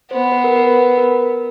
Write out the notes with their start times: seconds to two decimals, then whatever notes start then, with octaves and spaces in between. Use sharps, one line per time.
0.11 B3 C5
0.32 B4
0.44 A#4
0.56 B4
0.98 A#4